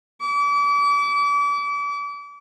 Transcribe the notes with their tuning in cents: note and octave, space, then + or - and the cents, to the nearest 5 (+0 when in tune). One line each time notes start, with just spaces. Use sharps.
D6 -35